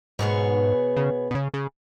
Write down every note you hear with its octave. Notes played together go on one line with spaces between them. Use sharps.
G#2 B2 B3 G#4 C#5
C#3
B2
C#3
C#3